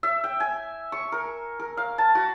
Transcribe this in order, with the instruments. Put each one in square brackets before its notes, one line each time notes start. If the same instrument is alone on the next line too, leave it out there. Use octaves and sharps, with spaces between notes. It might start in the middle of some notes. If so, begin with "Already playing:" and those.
[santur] E5
G5
G#5
C#6
A#4
A#4
F5
A5
F#4